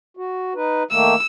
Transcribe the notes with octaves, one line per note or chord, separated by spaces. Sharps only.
F#4
D#4 B4
D#3 A3 A#3 E6